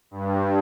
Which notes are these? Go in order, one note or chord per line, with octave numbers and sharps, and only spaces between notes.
G2